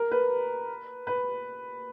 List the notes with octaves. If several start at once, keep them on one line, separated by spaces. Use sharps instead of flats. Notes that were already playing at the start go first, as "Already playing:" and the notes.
Already playing: A#4
B4
B4